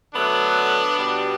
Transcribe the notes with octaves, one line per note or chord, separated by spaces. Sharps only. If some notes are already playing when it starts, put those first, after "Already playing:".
D3 F#3 A3 B3 D4
B2 G3 B3